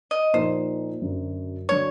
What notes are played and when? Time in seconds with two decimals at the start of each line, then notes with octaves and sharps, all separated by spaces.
0.11 D#5
0.33 A#2 F3 A#3 D#4 C5
1.01 F#2 D3 F#3
1.69 D3 F#3 C#5